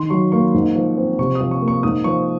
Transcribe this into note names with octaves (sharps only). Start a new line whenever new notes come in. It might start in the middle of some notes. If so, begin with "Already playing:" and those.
Already playing: D#3 C6
F#3 C#6
A#3 C#6
G#2
F3
C4
C3 C#6
D#6
F3
C#6
A#3
C#6
G#2 D#6
F3 C#6